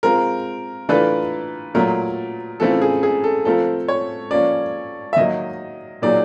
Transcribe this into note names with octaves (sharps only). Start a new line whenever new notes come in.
G#3 C4 F4 A#4
E3 A3 D4 F4 A4 B4
A#2 F#3 A3 A#4
C#3 E3 A3 C4 F4 A4
G#4
G#4
A4
F3 A3 C4 F4 A4 A#4
C#5
F3 A#3 C#4 D5
E5
D#3 F#3 A#3 D#5
A#2 F#3 A#3 D#4 G#4 D5